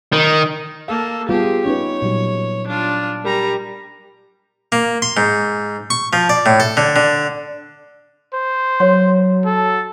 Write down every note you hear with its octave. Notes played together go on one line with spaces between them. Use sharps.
D#3
A#3 A4 F5
G3 B3 F4 G4 G#4
C#4 D#4 B4 C#5
A#2 F#3 G3
D4 F4
G3 A#4 A#5
A#3
C6
G#2
C#6
F3
D5
A2
A4
D3
D3
C5
F#3 C#5 F#5 C6
A4